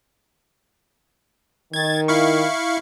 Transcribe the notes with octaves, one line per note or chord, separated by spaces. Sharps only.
D#3 G#6 A6
E4 F5 C#6